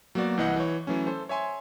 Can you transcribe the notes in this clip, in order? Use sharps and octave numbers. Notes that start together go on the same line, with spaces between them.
F#3 A#3 B3 F#4 D5
C2 E3 D#5 F#5 G6
E3 C#5
E3 F#3 A3 C#4
A4 C5
C#5 E5 G#5 C6